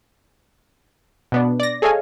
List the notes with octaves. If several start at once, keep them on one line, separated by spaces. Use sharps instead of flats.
B2 B3 D4
D5 A#6
G#4 A4 C#5 D#5 F5 G#5